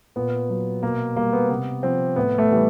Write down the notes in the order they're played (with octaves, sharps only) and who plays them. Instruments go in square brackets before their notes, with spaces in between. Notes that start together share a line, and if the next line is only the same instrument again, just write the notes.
[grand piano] A#2 B3
F#3
B2 A#3
G3 A#3
B3
C3 B3
F3 C4
A2 B3
A3
E3 G3